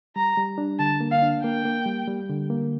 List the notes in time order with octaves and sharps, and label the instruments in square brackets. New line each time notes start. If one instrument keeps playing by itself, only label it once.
[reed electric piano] G3 [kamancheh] A#5
[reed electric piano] G3
D4
[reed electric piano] D3 [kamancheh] A5
[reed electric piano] A#3
[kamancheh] F5
[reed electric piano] D4
[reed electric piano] A#3 [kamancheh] G5
[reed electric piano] A#3
G3
G3
D3
A#3